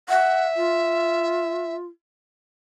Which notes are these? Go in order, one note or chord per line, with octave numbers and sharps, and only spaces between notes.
E5 F#5
F4